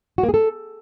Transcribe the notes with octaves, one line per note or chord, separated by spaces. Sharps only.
F#4
A#3
G#4
A4